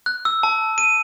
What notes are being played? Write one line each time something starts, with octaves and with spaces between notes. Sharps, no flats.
F#6
E6
A5
D#7